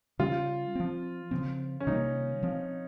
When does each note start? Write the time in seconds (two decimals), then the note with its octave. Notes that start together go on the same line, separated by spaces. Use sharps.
0.19 C#3 G3 C#4 F4
0.75 F3 C4
1.31 C#3 F3 C4
1.80 C#4
1.87 C3 D#3 G3 A#3 D#4
2.43 F3 C4